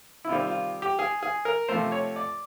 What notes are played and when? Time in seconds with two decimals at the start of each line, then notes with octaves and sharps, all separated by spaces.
0.25 E4
0.29 C3 D#3 G3 C4 F4
0.47 F4
0.82 G4
0.99 G#4
1.23 G#4
1.45 A#4
1.68 C3 F3 A3 C5
1.92 C#5
2.16 D5